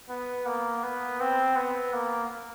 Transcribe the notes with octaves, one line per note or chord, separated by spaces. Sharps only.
B3
A#3
B3
C4
B3
A#3